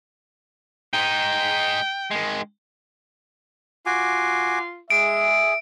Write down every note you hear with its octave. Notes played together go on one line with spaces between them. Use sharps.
G#3 D#4 G5
D#3 G#3
F4 F#4 G#5 D6
G#3 G#4 E5 D7